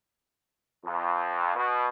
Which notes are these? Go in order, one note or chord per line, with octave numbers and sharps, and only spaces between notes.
F2
B2